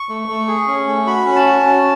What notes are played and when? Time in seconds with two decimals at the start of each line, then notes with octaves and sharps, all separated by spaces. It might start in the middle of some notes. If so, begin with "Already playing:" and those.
Already playing: C#6
0.09 A3
0.28 A3
0.48 G#4
0.68 C#4
0.87 A3
1.06 F#4 B5
1.26 C#4
1.36 A5
1.45 F#4
1.65 C#4